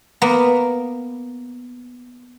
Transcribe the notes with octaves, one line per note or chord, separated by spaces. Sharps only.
A#3 B3